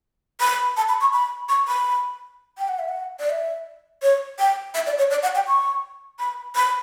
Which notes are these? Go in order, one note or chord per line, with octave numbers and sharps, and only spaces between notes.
B5
A5
B5
C#6
B5
C#6
B5
G5
F#5
E5
F#5
D5
E5
C#5
G5
E5
D5
C#5
D5
F#5
G5
C#6
B5
B5